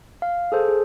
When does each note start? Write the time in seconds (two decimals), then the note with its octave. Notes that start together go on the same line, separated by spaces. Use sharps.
0.22 F5
0.52 G#4 A4 C5
0.68 G#4